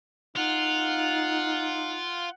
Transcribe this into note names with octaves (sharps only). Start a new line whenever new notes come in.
D#4 F4 F#5